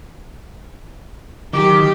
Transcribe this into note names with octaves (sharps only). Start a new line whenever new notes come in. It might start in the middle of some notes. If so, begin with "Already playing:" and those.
D#3 F#3 G4 D6